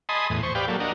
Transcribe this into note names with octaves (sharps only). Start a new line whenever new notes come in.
D#5 G#5 A5 B5 C6 D#6
E2 A2
C5 C#6
G4 B4 D5 F5 G5
F#3 A#3 A4
D4 F#4 A#4 D#5